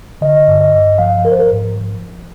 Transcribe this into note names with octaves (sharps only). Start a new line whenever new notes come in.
D3 D#5
G2
D#5
G2
F3 F5
F3 A#4
C5
A#4
G#2
F3